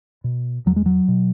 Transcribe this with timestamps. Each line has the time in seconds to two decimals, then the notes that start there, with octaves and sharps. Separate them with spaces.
0.24 B2
0.66 E2 F#3
0.76 G#3
0.86 F#3
1.08 B2